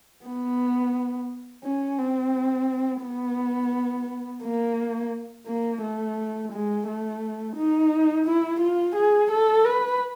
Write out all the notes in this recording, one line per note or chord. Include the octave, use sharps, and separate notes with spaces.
B3
C#4
C4
B3
A#3
A#3
A3
G#3
A3
D#4
E4
F4
G#4
A4
B4